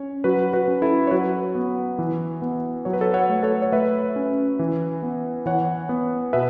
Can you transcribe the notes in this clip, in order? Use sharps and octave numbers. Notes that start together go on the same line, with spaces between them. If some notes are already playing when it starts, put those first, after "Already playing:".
Already playing: C#4 C#5
F#3 F#4 B4
F#4 B4
C#4
E4 A4
C#5
F#3 F#4 B4
B3
E3
B3
F#3 C#5
B4
A4 C#5
C#5 F#5
A3
A4 C#5
C#5
A3 B4 E5
C#4
E3
B3
E3 C#5 F#5
B3
B2 B4 E5